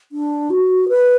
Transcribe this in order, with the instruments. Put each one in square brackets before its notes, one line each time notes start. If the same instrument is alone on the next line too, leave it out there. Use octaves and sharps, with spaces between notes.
[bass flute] D4
F#4
B4